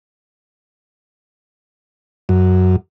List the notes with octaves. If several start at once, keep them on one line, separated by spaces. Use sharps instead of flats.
F#2